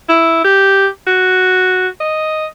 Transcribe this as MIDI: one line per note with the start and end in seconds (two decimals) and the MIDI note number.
0.09 0.43 64
0.44 0.88 67
1.07 1.88 66
2.01 2.46 75